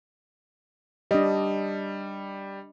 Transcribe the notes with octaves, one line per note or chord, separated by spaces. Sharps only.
G3 D4 D#5